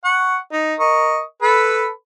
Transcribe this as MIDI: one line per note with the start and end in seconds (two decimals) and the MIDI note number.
0.04 0.36 78
0.04 0.36 85
0.52 0.74 63
0.80 1.21 70
0.80 1.21 75
0.80 1.21 85
1.42 1.89 69
1.42 1.89 71
1.42 1.89 83